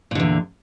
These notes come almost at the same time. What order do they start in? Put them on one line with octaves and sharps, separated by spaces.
A#2 D3 E2